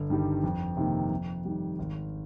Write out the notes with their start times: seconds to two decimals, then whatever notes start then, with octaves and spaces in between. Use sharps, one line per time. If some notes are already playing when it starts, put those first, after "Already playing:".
Already playing: G1
0.10 G2 D#3 G3
0.44 F2
0.77 C3 D#3 A#3
1.11 F2
1.45 D#3 G3
1.79 G#1